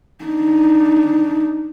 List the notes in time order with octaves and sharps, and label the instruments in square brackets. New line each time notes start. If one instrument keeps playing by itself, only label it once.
[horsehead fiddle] D4 D#4